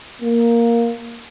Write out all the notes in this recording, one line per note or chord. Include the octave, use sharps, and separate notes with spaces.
A#3